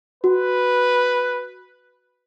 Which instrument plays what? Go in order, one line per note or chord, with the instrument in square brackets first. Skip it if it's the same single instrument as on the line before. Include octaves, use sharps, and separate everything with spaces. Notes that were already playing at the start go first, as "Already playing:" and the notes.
[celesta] F#4 [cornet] B4